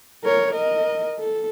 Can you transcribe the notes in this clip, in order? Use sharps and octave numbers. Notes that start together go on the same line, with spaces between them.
A#4 C#5
A#4 D#5
A4